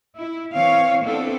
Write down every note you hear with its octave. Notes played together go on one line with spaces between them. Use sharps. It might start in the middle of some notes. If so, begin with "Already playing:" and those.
E4
E3 C4 C#5 F5
B3 C4 D4 E4 A4